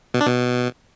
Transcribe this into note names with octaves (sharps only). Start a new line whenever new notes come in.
B2
D4
B2